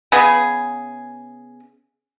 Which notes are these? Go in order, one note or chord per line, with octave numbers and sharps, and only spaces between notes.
C#3 B3 G#4